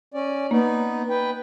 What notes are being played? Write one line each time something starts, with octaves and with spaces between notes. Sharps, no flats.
C#4 D5
A#3 B3 D#4
B4 G5